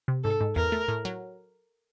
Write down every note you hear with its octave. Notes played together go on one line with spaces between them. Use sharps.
C3
G#2 A4
G#2
E2 A#4
A3
A2
F#3